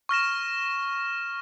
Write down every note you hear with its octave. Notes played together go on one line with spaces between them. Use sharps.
C#6 F6 A#6 E7